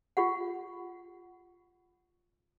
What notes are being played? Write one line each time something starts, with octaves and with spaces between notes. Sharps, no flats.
F4 G4 F#5